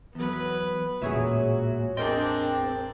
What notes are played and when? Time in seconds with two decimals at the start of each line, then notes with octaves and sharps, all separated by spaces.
0.15 E2 F#3 B3 B4
1.02 E1 A1 A#2 F#4 G#4 C#5 E5
1.97 C4 D4 G#4 A#4 D#5 G5 C6